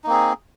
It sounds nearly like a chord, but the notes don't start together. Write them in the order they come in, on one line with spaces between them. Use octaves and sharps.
D#4 A#3 C4 G#4